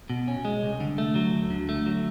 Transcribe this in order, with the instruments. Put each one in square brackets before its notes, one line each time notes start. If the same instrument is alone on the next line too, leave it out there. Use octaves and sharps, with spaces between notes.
[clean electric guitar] B2
C#4
G#3
C2
D3
A3
F#3
D2
D3
A3
F#3